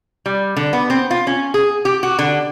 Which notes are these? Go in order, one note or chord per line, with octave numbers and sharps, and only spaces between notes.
G3
D3
B3
C4
F4
C#4
G#4
G4
F#4
D3